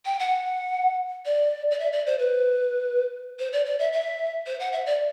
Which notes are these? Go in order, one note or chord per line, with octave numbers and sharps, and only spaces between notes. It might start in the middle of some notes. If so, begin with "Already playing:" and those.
G5
F#5
D5
D5
E5
D5
C5
B4
C5
D5
D5
E5
E5
C5
F#5
E5
D5